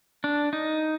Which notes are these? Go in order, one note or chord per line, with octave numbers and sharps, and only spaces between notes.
D4
D#4